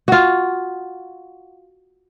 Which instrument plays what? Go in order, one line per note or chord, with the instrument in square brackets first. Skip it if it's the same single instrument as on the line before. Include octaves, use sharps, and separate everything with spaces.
[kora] F4 F#4